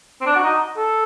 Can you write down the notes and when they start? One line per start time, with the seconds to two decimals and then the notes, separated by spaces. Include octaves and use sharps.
0.21 C4
0.26 D4
0.36 F#4
0.43 D#4
0.77 A4